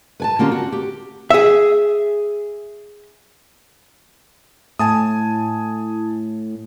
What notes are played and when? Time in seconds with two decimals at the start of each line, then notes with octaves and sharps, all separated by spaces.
0.20 B4 G#5 A5
0.39 D3 A#3 C#4 F4 G4
0.52 F#4
0.72 G4
1.31 G#4 E5
4.79 A2 G#5 A5 D#6